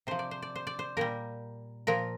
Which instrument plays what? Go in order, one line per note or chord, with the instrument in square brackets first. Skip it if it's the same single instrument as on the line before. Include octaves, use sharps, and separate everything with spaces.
[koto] C3 F3 C5
D5
C5
D5
C5
D5
C5
A#2 G3 A#4
A#2 F3 A#4